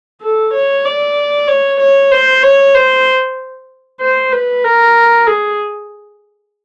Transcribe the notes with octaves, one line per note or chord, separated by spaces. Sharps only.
A4
C#5
D5
C#5
C#5
C5
C#5
C5
C5
B4
A#4
G#4